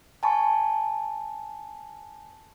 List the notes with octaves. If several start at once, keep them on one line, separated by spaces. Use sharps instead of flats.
G#5 A5 B5 C#6